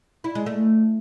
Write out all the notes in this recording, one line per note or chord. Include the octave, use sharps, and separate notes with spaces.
E4
G#3
A3